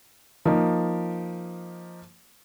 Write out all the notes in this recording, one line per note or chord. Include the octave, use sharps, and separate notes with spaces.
F3 A#3 D#4